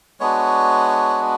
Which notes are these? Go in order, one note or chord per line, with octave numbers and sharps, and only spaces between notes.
G#3 B3 D4 F#4 C#5